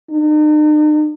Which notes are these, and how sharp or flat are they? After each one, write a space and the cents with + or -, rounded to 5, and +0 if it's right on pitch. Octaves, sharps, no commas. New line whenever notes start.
D#4 -45